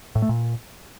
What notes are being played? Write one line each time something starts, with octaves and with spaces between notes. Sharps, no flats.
A2
A3
A#2